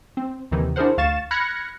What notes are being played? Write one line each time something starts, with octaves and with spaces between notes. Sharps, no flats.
C4
D#2 C3 D#3 E3
D4 E4 G#4 A#4 C5 F#5
D2 F5 C#6 A6 E7
B5 F6 F#6 G#6 A#6 C#7